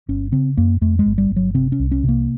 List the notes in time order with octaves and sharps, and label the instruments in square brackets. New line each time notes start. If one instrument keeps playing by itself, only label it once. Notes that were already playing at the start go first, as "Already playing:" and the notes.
[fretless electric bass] G1 C#4
C#3 C4
F#2 A#3
F2 A3
G#3
G1
G3
G1
F#3
C3 C4
C#4
C2
C#4
C3
A#3